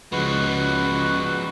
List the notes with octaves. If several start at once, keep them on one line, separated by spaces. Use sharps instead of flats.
C#2 F3 G#3 F#4 B4